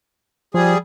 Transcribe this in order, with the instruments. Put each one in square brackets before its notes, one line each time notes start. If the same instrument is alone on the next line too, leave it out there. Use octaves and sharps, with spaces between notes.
[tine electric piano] F3 [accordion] G3 G#4